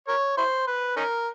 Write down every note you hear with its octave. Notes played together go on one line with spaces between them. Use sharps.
A#4 C#5
E4 C5
B4
C#4 D#4 A#4